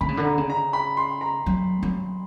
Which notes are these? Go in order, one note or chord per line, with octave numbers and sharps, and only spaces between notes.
D3 B5
C#3
D3
A#5
C#3
A#5
B5
C6
A#5
F#3
F#3